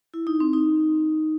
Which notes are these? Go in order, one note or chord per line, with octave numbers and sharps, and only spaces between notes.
E4
D#4
C4
D#4